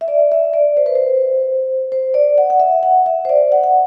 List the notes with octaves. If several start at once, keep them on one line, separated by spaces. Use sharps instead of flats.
E5
D5
E5
D5
C5
B4
C5
C5
D5
F#5
F#5
E5
F#5
E5
C5
D5
F#5
F#5